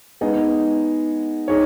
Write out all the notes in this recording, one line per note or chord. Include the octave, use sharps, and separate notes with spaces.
G#3 B3 D#4 G#4 D#5
D#4 G#4 C#5